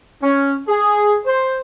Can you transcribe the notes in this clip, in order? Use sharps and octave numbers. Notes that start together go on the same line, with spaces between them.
C#4
G#4
C5